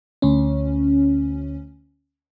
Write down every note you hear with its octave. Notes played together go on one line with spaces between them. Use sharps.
D2 C#4